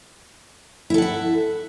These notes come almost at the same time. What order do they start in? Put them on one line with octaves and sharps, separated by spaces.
E4 A4 F#5 E5